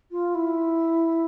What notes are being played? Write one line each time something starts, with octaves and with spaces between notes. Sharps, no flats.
F4
E4